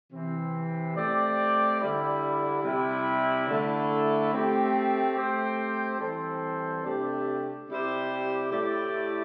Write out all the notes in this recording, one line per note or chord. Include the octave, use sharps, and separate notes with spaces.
C3 E3 C4
A3 C4 G4 D5
D3 G3 E4
C3 G3 E4
D3 A3 E4
A3 C4 G4
A3 C4 G4 C5
E3 G3 C4 A4 C5
C3 A3 D4 G4
C3 G3 E4 G4 C5
A2 A3 E4 G4 D5